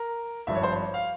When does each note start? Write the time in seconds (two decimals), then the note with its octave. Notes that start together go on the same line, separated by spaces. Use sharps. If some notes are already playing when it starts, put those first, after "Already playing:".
Already playing: A#4
0.47 G#1 G2 F3 E5
0.55 C#5
0.63 C5
0.72 C#5
0.94 F5